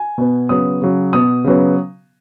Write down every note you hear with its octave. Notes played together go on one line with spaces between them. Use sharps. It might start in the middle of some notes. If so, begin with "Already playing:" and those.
Already playing: G#5
B2 B3
C#3 F#3 B3 D#6
C#3 F#3 C#4
B2 B3 D#6
C#3 F#3 B3